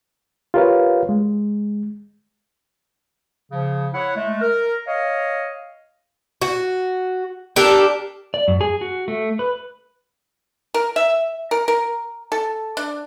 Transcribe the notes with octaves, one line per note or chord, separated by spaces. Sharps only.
F4 G4 A#4 B4 C#5 F5
G#3
C#3 F3
E4 C#5 F#5
G#3 A3
A#4
C#5 D#5 F5
F#4
D4 G4 A4 A#4
D5
F#2
G#4
F#4
A3
B4
A#4
E5
A#4
A#4
A4
D4